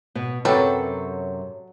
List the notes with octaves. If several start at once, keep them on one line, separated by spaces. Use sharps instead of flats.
B2
F#2 C3 F#3 G3 A4 B4